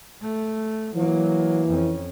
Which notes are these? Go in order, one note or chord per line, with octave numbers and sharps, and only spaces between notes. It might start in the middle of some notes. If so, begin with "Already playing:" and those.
A3
E3 F#3 A#3
F2 C#4